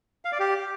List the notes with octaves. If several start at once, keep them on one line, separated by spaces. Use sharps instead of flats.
F5
D5
G4